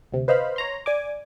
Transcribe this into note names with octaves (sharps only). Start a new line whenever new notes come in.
D2 C3
B4 C5 D#5 F5 B5
C#5 A#5 C6
D5 G#5 D6